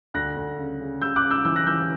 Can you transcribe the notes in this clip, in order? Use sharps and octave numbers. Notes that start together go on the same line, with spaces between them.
D2 F#6 A#6
D2
C#3
C#3
C#3 E6 G6
D6 F#6
C#3
E6 G6
E3 E6 G6
F#6 A#6
E3 E6 G6